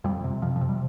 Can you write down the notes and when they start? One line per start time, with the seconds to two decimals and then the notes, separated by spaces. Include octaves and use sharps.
0.04 F2 G3
0.24 C3
0.42 F2 F3
0.56 F3
0.61 C3
0.69 G3